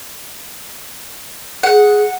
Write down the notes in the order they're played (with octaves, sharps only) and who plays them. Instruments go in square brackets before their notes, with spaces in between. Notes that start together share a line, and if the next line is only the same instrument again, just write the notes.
[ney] G#4 [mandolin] F#5